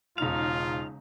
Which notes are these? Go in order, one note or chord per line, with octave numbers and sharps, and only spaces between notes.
E1 C#3 D#4 F4 F5 F7